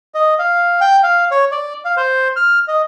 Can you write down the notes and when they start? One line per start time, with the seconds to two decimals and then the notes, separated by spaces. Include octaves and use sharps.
0.15 D#5
0.39 F5
0.81 G5
1.03 F5
1.31 C#5
1.52 D5
1.85 F5
1.97 C5
2.36 F6
2.68 D#5